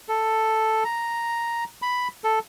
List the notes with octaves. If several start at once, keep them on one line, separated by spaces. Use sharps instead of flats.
A4
A#5
B5
A4